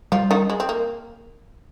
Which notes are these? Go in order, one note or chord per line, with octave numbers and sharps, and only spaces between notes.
F3 G3 F4
D#3 D#4
G#3
C4
A#3